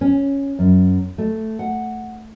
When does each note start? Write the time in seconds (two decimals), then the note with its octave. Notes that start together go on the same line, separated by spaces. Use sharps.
0.01 C#4
0.59 F#2
1.18 A3
1.59 F#5